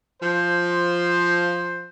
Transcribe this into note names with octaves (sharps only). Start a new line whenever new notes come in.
F3 C5